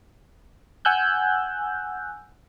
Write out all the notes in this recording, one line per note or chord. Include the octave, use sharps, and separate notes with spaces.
F#5 G#5 E6 F#6 G6